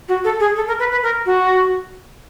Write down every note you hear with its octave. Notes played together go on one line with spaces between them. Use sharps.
F#4
A4
G#4
A4
A#4
B4
B4
A#4
F#4